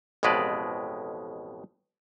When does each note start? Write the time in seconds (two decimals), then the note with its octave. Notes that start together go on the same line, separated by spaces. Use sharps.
0.23 A1 F2 B2 G#3 B4 D5